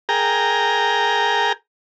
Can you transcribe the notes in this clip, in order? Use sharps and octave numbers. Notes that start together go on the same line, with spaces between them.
G#4 A#4 G5 A#5